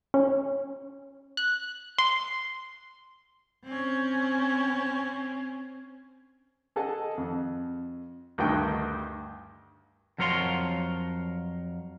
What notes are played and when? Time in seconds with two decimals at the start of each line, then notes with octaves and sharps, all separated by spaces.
0.14 C#4
1.37 F#6
1.98 C6
3.64 C4 C#4
6.76 G#4 A4 D#5 F#5 A5
7.18 F2
8.38 D2 G2 D#3 G5 C#6 F#6
10.18 F2 F#3 A#4 C#5 F5 C6